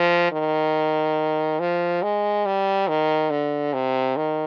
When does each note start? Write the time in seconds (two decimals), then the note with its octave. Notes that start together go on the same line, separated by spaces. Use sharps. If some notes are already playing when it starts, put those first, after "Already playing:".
Already playing: F3
0.32 D#3
1.60 F3
2.03 G#3
2.46 G3
2.88 D#3
3.30 D3
3.73 C3
4.16 D#3